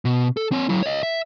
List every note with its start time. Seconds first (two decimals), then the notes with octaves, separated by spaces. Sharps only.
0.05 B2
0.37 A4
0.52 C4 C#5
0.69 F#3 E4
0.83 C#5 D#5
1.03 E5